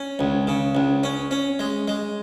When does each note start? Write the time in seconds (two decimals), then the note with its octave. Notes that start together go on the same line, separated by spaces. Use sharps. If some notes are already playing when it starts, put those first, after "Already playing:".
Already playing: C#4
0.19 C#2
0.47 C#3
0.75 C#2
1.03 C#4
1.31 C#4
1.59 G#3
1.88 G#3